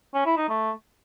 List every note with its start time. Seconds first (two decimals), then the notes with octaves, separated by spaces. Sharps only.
0.14 C#4
0.26 E4
0.37 D#4
0.49 A3